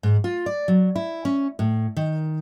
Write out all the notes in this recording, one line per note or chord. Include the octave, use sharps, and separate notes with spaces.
G#2
F4
D5
F#3
E4
C#4
A2
D#3